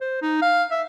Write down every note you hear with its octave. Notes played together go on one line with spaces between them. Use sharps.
C5
D#4
F5
E5